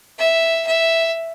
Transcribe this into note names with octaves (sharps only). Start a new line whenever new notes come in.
E5
E5